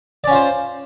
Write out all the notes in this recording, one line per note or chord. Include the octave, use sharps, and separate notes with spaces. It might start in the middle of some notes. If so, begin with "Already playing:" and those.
C#4 F4 C5 D5